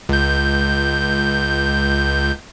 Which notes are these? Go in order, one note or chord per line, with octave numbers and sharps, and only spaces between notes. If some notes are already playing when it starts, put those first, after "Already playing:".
C#2 G6